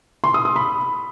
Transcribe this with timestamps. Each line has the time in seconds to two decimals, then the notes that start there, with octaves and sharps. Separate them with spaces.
0.24 C6
0.34 D#6
0.45 D#6
0.56 B5